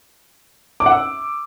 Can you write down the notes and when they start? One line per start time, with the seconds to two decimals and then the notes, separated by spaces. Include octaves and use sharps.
0.80 D6
0.86 F#5
0.92 E6